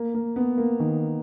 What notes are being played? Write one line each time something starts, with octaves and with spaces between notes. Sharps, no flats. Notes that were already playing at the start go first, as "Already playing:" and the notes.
Already playing: A#3
A#3
B3
A#3
D#3